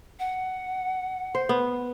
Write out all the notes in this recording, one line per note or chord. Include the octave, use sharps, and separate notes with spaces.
F#5
C5
B3